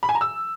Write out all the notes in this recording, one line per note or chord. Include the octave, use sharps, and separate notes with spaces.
B5
G#5
A#5
E6